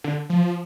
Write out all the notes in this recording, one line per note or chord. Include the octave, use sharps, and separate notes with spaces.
D3
F3